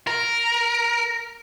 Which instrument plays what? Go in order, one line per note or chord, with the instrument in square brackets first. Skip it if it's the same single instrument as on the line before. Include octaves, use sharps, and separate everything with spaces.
[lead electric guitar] A#4